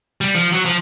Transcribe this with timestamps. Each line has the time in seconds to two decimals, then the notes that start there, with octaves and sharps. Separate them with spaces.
0.21 G3
0.35 F3
0.52 F#3
0.65 F3